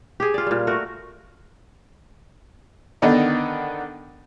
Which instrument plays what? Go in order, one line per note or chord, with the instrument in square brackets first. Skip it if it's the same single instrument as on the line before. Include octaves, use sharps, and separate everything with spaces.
[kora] G4 G#4
F4 D5
A#2 G3
A3 F#4 A#4
[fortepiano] D3 D#3 B3 D4 D#4